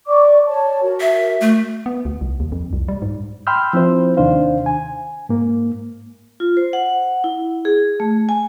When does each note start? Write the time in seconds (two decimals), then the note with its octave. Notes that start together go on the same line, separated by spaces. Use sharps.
0.07 D5 C#6 D6
0.47 C#5 A5
0.83 F#4 A#4
1.00 E5
1.41 A3
1.86 B3
2.05 D2
2.21 C2
2.40 D#2
2.52 F2
2.73 C2
2.88 G3
3.02 G#2
3.47 G5 B5 C6 E6 F6 G6
3.73 F3 C4 E4 C5
4.17 D#2 C3 D#3 D4 C5 F5
4.66 G#5
5.29 G#2 A#3
6.40 F4
6.57 C5
6.73 F#5
7.24 E4
7.65 G#4
8.00 A3
8.29 G#5